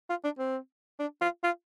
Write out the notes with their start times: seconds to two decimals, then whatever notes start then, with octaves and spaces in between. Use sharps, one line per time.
0.10 F4
0.24 D4
0.39 C4
0.99 D4
1.21 F4
1.44 F4